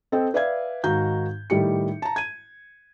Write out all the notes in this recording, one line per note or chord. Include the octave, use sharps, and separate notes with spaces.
C4 A4 D#5 G5
B4 D5 E5 F5 G#6
G#2 D#3 F#4 F5 A#5 G6
A2 D#3 G3 G4 C#7
A5 A#5
G#6 D#7